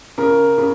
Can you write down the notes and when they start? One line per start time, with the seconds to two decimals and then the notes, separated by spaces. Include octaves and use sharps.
0.18 C#3 A#4
0.58 C#3